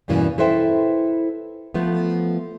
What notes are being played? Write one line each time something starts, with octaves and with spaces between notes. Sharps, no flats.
E2 G2 B2 E3 A#3 C#4
E4 A4 B4 C5 E5 G5
F3 A3 B3